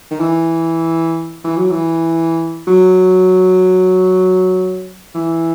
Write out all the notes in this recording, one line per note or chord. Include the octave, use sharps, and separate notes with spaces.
D#3
E3
E3
F#3
E3
F#3
E3